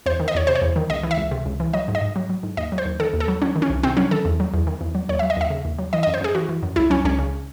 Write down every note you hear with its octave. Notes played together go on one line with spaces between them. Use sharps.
E2 C5
D#3
D#5
E2 C#5
C3 C5
C#5
E2
D#3
C#2 D#5
E3
E5
C#2
C3
C#2
E3
F#3 D#5
G#2
D#5
G#2
F#3
F#3
G#2
D#2 D#5
F#3
C5
D#2
D#3 A4
D#2
A4
F#3
F#3 C#4
D#3
C#4
C2
C3 C4
F#3 C#4
D#3 A4
E2
F#3
E2
D#3
E2
F#3
D#2 C#5
E5
F#3
D#5
D#2 E5
C#3
D#2
F#3
E3 D#5
D#5
F#2
C5
F#2 G#4
E3 F#4
E3
F#2
C#2 E4
F#3 C#4
C#2 C#4
C#3